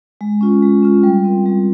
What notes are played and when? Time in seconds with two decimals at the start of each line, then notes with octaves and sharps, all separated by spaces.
0.21 G#3
0.41 C#4 F4
0.63 G#3
0.83 C#4 F4
1.03 G3
1.25 C4 F4 A#4
1.46 G3